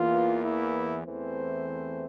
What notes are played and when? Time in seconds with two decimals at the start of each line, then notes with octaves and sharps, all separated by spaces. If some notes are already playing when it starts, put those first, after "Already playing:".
Already playing: E2 E3 A#3 F4
0.44 E4
1.05 E2 E3 A3 C4 C5